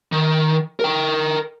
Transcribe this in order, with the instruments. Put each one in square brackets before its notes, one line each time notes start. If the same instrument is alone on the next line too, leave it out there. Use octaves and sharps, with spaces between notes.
[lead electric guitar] D#3
A#4 G5